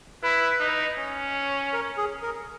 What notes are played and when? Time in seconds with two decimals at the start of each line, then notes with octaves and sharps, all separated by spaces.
0.23 E4 B4
0.60 D#4
0.98 C#4
1.73 A#4
1.98 G#4
2.23 A#4